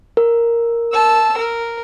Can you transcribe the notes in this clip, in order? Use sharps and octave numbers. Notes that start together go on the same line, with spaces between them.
A#4
A5 E6
A#4